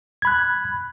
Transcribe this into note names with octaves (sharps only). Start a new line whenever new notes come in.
B5 F#6 G#6